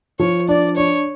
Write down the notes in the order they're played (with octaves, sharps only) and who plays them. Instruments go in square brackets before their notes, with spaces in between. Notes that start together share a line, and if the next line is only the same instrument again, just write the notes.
[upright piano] F3 [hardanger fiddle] C#5
[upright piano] D4 [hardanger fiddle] D5
[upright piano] D4 [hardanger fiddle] C#5